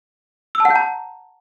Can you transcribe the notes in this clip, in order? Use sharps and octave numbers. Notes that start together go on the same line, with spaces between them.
E6
A5
F#5
G6
A#5